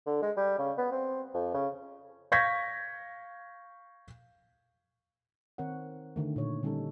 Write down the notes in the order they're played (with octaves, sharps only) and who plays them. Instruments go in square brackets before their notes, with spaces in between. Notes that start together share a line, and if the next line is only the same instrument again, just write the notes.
[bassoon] D3
G#3
G3
C#3
B3
C4
F2
C#3
[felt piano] F5 C#6 G6 G#6 A#6 B6
[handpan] D#3 C4 A#4 C#5 F#5
D3 D#3 A3
A#2 C#5
D3 G3 C#4 D#4 A4